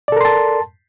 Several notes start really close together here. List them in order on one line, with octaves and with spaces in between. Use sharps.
D5 A4 A#4 C6 A5